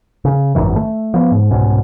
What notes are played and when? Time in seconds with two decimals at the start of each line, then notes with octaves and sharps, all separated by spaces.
0.25 C#3
0.55 G#1 F#2 D#3 E3
0.76 A3
1.14 F3 B3
1.32 G#2
1.51 C2 G#2 B2 C#4